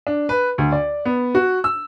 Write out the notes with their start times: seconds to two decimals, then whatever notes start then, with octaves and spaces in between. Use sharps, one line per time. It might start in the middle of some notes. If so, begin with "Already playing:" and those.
0.07 D4
0.29 B4
0.58 D2
0.72 D5
1.06 B3
1.35 F#4
1.64 E6